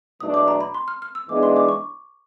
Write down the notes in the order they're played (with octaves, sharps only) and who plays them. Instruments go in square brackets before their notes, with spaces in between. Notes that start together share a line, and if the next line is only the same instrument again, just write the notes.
[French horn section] E2 B2 F#3 A3 D4 [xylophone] D#6
[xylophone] D6
A#5
B5
C6
F6
F6
E6
[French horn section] G#2 E3 G#3 B3 D4 [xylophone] D6
[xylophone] C6
D6
C#6